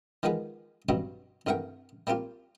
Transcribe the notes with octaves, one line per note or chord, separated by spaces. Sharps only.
D#3 F3 G#3 B3 G#4 B4
G2 B2 F#3 G3 C4 F#4
C2 G2 A3 A#4 F#5 G5
G3 A#3 C4 F4 G4